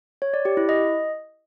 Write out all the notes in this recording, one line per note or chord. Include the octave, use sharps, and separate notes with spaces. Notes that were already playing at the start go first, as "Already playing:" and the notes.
C#5
D5
G4
E4
D#5